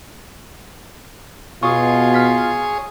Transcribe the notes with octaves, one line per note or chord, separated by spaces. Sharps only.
B2 F4 G#4 C#5 C#6 D#6
F6 B6